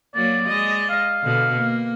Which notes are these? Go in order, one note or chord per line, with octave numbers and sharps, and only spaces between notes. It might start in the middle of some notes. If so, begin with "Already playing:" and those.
F#3 A#3 D5
G#3 D#5
F5
B2 D3
A#3